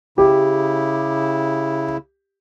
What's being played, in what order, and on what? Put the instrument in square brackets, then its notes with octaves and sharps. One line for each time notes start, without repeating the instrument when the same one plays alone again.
[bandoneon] C#3 E4 [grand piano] G4